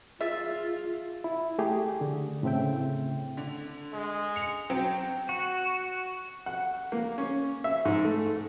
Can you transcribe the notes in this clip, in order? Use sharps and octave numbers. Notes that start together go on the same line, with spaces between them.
F4 G#4 E5 A6
E4
A3 G4 G#4
D3
A2 C#3 C4 E5 G5
D3
G#3
C#7 F7
F#3 C4 G5
F#4
F#5
A#3
C#4
E5
G#2
A3